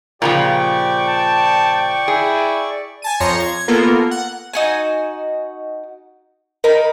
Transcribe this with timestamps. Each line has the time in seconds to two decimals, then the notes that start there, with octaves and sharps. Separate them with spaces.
0.22 A#2 C#3 F3 G4 D5 G5 C#6
1.08 A5
2.08 E4 G#4
3.02 G#5 A5 D#7
3.20 F2 F3 C#5 A#5 C6 C#6
3.40 G#6
3.68 A#3 B3 F4 A4 A#4
4.11 F#5
4.53 D#4 F#4 G#5
6.64 D#4 A#4 A#5 B5